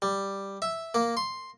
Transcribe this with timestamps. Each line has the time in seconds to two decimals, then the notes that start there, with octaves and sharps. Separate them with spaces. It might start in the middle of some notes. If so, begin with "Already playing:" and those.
0.02 G3
0.62 E5
0.95 A#3
1.17 C6